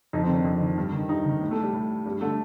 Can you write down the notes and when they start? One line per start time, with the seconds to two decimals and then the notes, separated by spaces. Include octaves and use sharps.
0.13 F2 D#4
0.24 C4
0.29 D#3
0.34 D4
0.44 F2
0.61 D#3
0.77 G2
0.92 D#3
1.09 G2 D#4
1.25 D#3
1.41 A2
1.51 A3
1.63 G3
1.73 A2
2.05 G2 G3
2.21 D3 A3